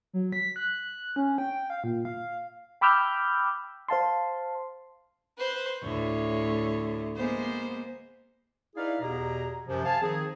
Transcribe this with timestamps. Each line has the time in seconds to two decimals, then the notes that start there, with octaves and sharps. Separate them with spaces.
0.13 F#3
0.33 B6
0.56 F#6
1.16 C#4
1.38 G5
1.70 F5
1.84 A#2
2.05 F5
2.81 G5 B5 D6 E6 F6 G6
3.88 C5 F5 A5 C6
5.38 B4 C5
5.83 D2 A2 C#5
7.16 G#3 A#3 B3 C5
8.76 D#4 E4 G#4 B4 D5 F5
9.01 E2 B2 G4 G#4 A#5
9.67 F#2 C3 F3
9.85 F5 G#5 A5
10.02 D#3 F3 C4 D#4 G#4